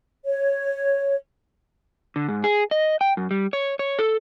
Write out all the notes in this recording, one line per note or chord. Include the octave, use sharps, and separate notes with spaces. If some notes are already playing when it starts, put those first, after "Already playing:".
C#5
D3
G#2
G#4
D#5
G5
F#2
G3
C#5
C#5
A4